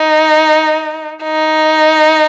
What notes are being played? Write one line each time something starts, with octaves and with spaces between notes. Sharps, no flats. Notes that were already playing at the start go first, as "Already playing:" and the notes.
Already playing: D#4
D#4